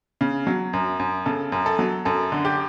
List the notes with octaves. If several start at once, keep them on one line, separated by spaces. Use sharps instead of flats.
C#3
F#3
F#2
F#2
C#3 A4
F#2
A4
F#3
F#2 A4
D3
G4